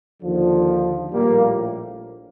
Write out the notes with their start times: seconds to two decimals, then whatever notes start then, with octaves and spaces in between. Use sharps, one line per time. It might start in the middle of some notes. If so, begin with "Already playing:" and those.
0.23 D#2 D3 F3
1.12 A#1 A2 F3 G3 A#3